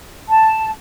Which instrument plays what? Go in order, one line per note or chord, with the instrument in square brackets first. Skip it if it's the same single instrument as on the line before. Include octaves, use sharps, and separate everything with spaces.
[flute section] A5